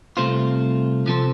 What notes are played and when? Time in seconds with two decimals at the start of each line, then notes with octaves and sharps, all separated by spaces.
0.17 C2 C3 A3 F4 C5
1.06 C3 F3 C4 A4 C5